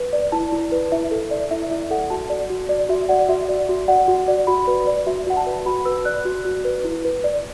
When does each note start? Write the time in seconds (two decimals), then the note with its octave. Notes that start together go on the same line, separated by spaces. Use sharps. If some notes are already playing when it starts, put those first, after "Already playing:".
Already playing: B4
0.13 D5
0.32 E4 A5
0.52 E4
0.72 B4
0.92 E4 E5
1.11 A4
1.31 D5
1.51 E4 E5
1.71 E4 E5
1.90 A4 F#5
2.10 F#4 A5
2.30 D5
2.50 F#4
2.69 D5
2.89 F#4 E5
3.09 D5 F#5
3.29 F#4 E5
3.49 D5
3.69 F#4
3.88 D5 F#5
4.08 F#4
4.28 D5
4.47 F#4 B5
4.67 B4
4.87 D5
5.07 F#4 E5
5.27 F#4 F#5
5.37 A5
5.46 B4
5.66 F#4 B5
5.85 B4 E6
6.05 D5 F#6
6.25 F#4
6.45 F#4
6.65 B4
6.84 E4
7.05 B4
7.24 D5